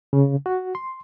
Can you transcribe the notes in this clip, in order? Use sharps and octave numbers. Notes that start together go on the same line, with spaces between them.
C#3
F#4
C6